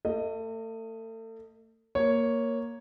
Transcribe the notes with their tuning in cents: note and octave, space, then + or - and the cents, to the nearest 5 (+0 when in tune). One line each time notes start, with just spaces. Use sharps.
A3 +35 D#5 +0
A#3 +0 C#5 +0